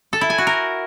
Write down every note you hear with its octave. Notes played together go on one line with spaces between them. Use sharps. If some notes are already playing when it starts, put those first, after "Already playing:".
A4
E4
G#5
F#4
A#4